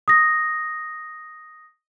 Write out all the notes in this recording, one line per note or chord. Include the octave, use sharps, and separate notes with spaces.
D#6 A#6